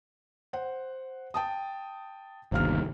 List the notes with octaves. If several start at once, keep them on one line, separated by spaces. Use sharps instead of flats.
C5 F#5
G5 A5 D#6
G1 D#2 C3 F5 F6